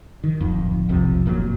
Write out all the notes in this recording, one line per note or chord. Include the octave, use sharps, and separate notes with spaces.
D#3
D1 F2
E1 B1 C3 F3
F1 A#2 C#3 F#3